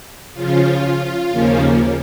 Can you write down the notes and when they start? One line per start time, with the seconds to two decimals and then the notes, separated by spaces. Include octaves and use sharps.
0.34 C#3 F3 C#4 F4
1.31 D#2 C#3 F3 A#3 C#4